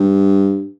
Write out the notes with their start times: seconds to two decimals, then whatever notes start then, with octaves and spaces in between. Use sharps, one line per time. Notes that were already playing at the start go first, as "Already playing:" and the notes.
Already playing: G2